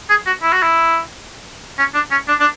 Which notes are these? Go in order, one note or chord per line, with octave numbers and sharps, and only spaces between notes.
G#4
F#4
E4
F#4
E4
C#4
D4
C#4
D4
D4